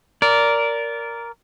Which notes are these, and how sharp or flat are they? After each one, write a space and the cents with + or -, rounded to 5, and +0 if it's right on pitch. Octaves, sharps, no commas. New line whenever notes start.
A#4 +0 D5 -20